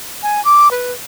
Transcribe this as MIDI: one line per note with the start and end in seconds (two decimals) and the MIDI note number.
0.23 0.43 80
0.45 0.71 86
0.71 0.92 71